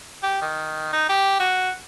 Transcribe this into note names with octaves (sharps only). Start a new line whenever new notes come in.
G4
D#3
D#4
G4
F#4